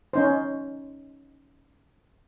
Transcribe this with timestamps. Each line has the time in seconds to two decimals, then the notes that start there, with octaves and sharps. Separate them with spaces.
0.13 C#4 D#4 C5